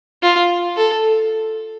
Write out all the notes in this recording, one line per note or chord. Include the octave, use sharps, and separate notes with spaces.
F4
A4